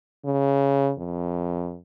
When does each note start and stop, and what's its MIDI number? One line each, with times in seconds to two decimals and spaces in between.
0.25 0.91 49
0.98 1.78 41